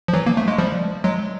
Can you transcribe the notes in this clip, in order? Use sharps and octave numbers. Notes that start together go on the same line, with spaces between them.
F3
E3 F#3
A#3
A3
G#3
F3 G3
F#3 G#3